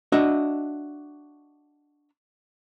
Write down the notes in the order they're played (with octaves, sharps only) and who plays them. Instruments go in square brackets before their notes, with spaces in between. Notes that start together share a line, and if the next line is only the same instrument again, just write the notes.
[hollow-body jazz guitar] D4 F#4 D#5 E5